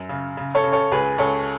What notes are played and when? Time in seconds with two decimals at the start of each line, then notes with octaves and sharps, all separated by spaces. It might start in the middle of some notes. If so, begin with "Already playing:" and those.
Already playing: F#2
0.09 C#3
0.37 C#3
0.55 A4 C#5
0.64 C#3
0.73 A4 C#5
0.92 C#2 G#4 B4
1.18 C#2 A4 C#5